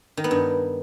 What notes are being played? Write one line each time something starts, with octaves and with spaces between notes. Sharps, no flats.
D#3
B3
G2